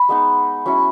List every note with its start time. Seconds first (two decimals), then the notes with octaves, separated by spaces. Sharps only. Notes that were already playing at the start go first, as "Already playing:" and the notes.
Already playing: B5 C#6
0.09 G#3 B3 D#4
0.66 F#3 C#4 E4 C#6